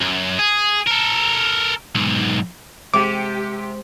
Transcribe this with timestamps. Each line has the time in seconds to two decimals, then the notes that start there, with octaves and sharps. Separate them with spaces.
0.01 F#2
0.39 G#4
0.87 A4 A#4
1.95 B1 G#2
2.94 C3 G#3 G4 C5 F#5 D6